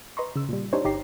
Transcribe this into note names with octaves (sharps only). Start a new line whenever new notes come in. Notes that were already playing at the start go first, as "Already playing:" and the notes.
B4 D#5 A#5 C6 C#6
C#3 E6
A#2 G3
D4 D#4 G4 C5 C#5
G1 D#4 G4 A#5 C7